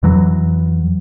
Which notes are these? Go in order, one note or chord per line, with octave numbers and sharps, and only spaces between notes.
F2 E3 F#3